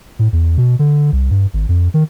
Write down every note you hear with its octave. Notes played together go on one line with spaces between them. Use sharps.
A2
E2
B2
D3
C2
G2
G#1
F2
D#3